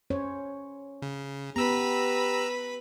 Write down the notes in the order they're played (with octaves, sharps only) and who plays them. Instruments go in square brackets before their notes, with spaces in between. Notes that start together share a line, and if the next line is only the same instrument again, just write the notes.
[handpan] C#4 C5 C#5
[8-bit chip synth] C#3
[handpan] B3 [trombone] G4 [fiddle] B4 B5 [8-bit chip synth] A#5 E6